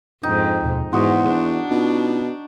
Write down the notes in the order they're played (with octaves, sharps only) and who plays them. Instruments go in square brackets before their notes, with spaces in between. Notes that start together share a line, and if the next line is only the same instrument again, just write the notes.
[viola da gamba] F2 G#2 [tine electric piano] D4 [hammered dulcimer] D#4 G5
[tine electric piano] D#2 B2
[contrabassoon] E2 [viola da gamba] G#2 [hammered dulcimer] F#4 [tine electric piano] C6 D#6
[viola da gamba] D4
[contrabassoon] B2 [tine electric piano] C#4 D#4 F4